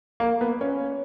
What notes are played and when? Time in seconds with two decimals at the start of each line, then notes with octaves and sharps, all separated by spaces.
0.20 A#3
0.41 B3
0.61 C#4